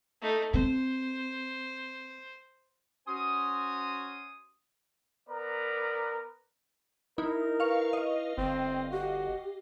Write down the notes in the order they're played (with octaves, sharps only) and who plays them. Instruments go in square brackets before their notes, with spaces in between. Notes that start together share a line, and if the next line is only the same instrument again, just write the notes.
[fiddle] A3 D#4
[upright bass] C4 [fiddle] C5
[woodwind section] C#4 F#4 C5 G#5 C6 D#6
[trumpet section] B3 A#4 B4 D5 A#5
[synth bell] D#4 [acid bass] E4 [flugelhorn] A#4
[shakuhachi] B4 [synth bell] F5 C#6
[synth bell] D#5 F5
[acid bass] G1 [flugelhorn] C4 [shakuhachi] G5
[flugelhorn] F#4 [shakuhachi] G4